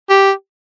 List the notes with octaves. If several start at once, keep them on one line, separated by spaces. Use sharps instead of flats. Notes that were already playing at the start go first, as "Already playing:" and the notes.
G4